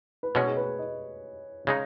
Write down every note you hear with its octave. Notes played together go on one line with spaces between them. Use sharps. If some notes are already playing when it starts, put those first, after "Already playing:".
B4
B2 G#3 C#4 C#5
G#4
B4
D#5
C#3 G#3 D#4